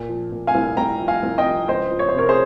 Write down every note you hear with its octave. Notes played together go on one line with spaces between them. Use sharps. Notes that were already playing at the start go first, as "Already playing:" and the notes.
Already playing: A#2
F3
A#2
F5 G#5
C2
C2 G5 A#5
F3
F5 G#5
C2
D#5 G5
F3
C#2 C5 D#5
F3
C#5
C5
C3 A#4 C#5
G#4 C5